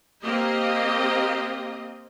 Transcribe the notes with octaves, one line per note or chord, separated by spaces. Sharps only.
A#3 C4 G4 D#5